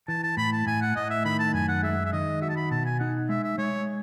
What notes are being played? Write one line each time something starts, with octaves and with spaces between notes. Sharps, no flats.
E3 A5
A5
A2 B5
A5
A2 G#5
F#5
A2 D#5
E5
D#3 B5
A5
F#2 G#5
F#5
G#3 E5
E5
D#3 D#5
F#4 E5
A5
B5
B2 A5
G#5
D#4 F#5
G#3 E5
E5
G#3 C#5